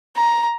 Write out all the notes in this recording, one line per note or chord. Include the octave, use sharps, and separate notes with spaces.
A#5